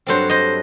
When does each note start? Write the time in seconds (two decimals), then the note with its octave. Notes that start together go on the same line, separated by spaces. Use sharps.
0.07 G2 F#3 C4 A4 C5
0.29 C5 D#5